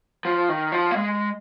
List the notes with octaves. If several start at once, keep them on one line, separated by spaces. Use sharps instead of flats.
F3
D#3
F3
A#3
G#3